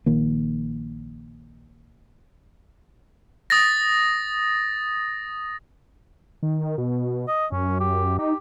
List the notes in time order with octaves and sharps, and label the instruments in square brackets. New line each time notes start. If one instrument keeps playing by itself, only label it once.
[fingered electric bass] A#1 D#3 A#3
[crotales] D#6 A6 A#6
[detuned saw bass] D#3
B2
[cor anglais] D#5
[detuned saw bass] F#2 [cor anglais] C#4
[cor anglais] G4
[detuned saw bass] D#4 [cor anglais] G4